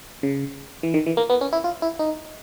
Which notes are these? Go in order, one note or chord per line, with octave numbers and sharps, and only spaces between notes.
C#3
E3
D#3
E3
A#3
B3
C#4
E4
F4
E4
D#4